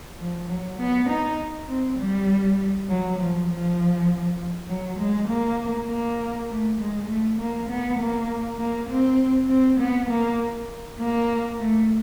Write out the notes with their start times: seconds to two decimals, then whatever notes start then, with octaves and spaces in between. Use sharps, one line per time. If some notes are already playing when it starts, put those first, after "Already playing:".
0.19 F3
0.48 F#3
0.79 B3
1.09 D#4
1.69 C4
1.99 G3
2.89 F#3
3.19 F3
3.49 F3
4.69 F#3
4.99 G#3
5.29 A#3
5.90 A#3
6.49 A3
6.80 G#3
7.08 A3
7.39 A#3
7.69 B3
7.99 A#3
8.59 A#3
8.89 C4
9.49 C4
9.80 B3
10.09 A#3
10.99 A#3
11.59 A3